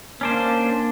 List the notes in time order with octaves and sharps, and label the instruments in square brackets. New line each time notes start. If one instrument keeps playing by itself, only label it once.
[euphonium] A#3 [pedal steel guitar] C#4 D4 C5